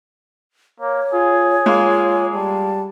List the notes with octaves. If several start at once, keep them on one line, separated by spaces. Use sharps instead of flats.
A#3 C#5
F4 G#4
G#3 A#3 F4
G3 A5